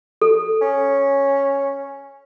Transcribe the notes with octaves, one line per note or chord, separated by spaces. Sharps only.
A4
C#4